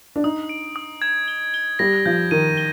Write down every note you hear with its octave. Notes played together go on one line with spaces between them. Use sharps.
D4
D#4 D#6
D7
D#6
G#6
G7
G7
G3 A#6
F3 G6
D#3 D#7
G7